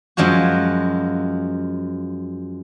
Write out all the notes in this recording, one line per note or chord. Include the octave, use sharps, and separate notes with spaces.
F#2 F3 G#3 F4 F#4